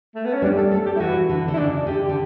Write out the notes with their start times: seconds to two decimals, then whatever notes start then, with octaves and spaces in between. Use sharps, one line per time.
0.15 A3
0.25 B3
0.34 C#4
0.42 G3 D4
0.57 A4
0.71 A3 A4
0.86 G4
0.96 E4
1.00 E3 F#4
1.29 D3
1.48 D3
1.54 E4
1.57 C#3 D4
1.87 D3 G4
2.04 D3 G4